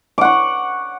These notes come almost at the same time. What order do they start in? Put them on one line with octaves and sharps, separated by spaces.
D6 F#5 C#6